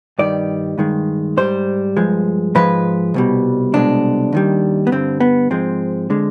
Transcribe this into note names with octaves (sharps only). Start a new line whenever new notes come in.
G2 D#3 G3 D5
G2 D#3 G#3
G#2 G3 C5
G2 F3 G#3
G#2 F3 G#3 B4
C2 B2 G3
C2 B2 G#3 D4
D#2 D#3 G3
B3
G2 D3 G3 C4
B3
G#2 F3 G#3 C4
D3 G#3